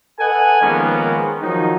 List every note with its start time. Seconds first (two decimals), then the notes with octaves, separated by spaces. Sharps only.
0.20 A4 B4 D#5 F#5 G#5
0.62 D#3 F3 G#3 A#3 B3 C#4
1.42 D#3 F3 F#3 D#4